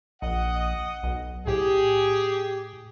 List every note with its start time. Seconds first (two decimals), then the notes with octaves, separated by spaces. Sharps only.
0.22 A#1 D#5 F#5
1.03 B1
1.47 A2 G4 G#4